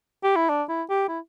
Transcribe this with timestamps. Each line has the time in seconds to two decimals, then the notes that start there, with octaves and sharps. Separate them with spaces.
0.23 G4
0.36 E4
0.49 D4
0.69 E4
0.90 G4
1.08 E4